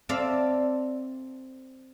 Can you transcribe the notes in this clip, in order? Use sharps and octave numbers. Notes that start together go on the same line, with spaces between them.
C4 A4 D5 E5 F5